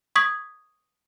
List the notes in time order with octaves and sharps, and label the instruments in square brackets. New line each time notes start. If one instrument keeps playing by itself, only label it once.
[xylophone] C#6 D#6 G#6 B6